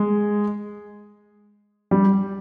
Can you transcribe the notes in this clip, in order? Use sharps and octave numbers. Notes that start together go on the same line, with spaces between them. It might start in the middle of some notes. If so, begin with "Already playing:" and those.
Already playing: G#3
G3